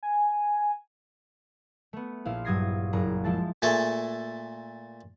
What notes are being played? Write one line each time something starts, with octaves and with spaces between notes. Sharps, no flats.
G#5
A3 B3
A#1 E4 C5 F5
G2 F#3 D#6 G#6 A#6 C7
F#1 G#4 A#5
F3 G#3 E4 A5 A6
A#2 A3 G#4 A4